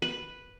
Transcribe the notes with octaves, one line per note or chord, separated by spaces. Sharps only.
B4